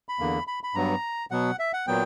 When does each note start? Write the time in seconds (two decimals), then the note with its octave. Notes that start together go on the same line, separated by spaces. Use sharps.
0.09 B5
0.19 E2 D3 A#3
0.47 B5
0.63 B5
0.75 G2 F#3 B3 A#5
1.31 B2 F#3 B3 F#5
1.59 E5
1.73 F#5
1.87 A#2 F#3 B3 G5